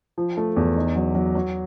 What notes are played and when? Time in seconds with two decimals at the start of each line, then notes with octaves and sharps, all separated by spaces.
0.18 F3
0.37 A3
0.56 E2
0.76 D#4
0.95 F#3
1.15 F#3
1.35 F#3